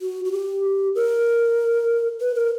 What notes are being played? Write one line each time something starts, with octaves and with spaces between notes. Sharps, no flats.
F#4
F#4
G4
A#4
B4
A#4